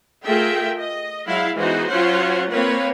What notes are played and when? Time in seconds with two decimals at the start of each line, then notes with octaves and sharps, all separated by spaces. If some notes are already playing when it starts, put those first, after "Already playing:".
0.24 A3 F4 G#4 A#4 E5 G5
0.80 D#5
1.27 F#3 G#3 E4 F5
1.57 E3 G#3 B3 D#4 F#4 C5
1.90 F#3 C#4 F4 C5 C#5 F#5
2.51 A#3 C4 B4 C#5